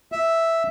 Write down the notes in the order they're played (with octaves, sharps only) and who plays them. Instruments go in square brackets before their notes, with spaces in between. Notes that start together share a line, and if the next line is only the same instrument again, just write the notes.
[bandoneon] E5